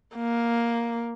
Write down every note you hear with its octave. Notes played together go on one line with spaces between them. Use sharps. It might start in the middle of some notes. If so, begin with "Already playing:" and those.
A#3